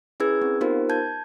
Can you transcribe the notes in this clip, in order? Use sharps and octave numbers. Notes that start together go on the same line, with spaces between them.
C#4 E4 G#4 B4 E6 G#6
C4
B3 D#4 F4 G4 A#4 C5
A5 G6 G#6